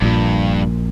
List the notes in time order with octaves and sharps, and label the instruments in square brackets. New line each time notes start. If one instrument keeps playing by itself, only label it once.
[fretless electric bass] A#1 A#2 [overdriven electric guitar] G2